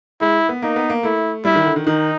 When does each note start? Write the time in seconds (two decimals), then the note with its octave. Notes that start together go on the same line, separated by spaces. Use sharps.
0.21 G#3 E4
0.49 B3
0.62 A#3 D#4
0.76 B3
0.90 A#3
1.03 A3 E4
1.45 G3 E4
1.55 D#3
1.65 D3
1.76 D#3
1.86 D#3 D#4